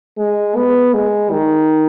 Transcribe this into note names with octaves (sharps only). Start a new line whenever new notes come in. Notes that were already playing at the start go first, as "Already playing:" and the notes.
G#3
B3
G#3
D#3